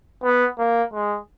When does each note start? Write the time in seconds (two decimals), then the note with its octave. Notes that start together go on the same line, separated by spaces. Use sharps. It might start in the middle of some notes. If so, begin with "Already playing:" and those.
0.24 B3
0.59 A#3
0.94 G#3